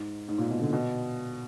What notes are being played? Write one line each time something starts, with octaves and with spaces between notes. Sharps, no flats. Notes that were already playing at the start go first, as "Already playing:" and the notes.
Already playing: G#2
G#2
A#2
B2
D3
B2